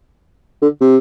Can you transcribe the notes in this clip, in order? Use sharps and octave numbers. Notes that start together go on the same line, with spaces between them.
D3
C3